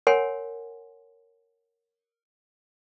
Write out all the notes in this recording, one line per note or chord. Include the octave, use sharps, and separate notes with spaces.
A#4 C#5 F#5 G#5 C6